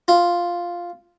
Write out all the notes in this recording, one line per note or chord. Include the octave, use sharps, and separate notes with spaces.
F4